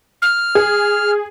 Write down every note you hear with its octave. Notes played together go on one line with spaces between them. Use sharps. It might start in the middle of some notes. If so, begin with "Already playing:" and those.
F6
G#4